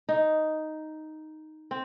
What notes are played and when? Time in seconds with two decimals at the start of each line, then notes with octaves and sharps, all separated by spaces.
0.09 D#4
1.71 C4